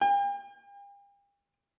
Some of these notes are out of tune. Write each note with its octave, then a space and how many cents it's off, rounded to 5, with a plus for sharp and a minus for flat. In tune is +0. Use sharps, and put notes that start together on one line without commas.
G5 +45